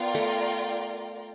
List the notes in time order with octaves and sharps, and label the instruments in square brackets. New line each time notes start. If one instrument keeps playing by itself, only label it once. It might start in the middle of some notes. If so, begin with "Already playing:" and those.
Already playing: [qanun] B3 [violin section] F4 A#4 D5 G5
[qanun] A3